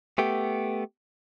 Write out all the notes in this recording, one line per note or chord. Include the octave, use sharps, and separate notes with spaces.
A3 B3 G4